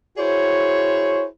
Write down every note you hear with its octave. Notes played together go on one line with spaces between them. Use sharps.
E4 F#4 G#4 C5 C#5